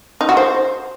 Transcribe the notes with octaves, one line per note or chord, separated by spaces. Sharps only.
D#4
F#4
C5